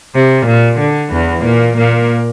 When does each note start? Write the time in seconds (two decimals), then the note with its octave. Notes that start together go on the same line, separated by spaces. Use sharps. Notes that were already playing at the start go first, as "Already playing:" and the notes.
0.14 C3
0.46 A#2
0.79 D3
1.12 E2 E3
1.45 A#2 A#3
1.77 A#2 A#3